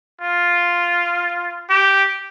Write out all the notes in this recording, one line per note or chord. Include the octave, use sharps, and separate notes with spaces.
F4
G4